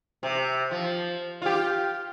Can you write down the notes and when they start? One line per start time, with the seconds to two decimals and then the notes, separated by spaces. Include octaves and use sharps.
0.23 C3
0.71 F3
1.42 F4 G4